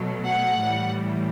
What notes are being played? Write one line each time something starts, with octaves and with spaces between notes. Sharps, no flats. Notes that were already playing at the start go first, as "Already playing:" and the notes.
Already playing: B2 F#3 A3
F#5
A2 E3 G3